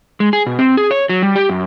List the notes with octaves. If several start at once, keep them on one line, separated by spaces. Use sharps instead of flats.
G#3
G#4
B2
C4
G#4
C#5
F#3
G3
G4
F#2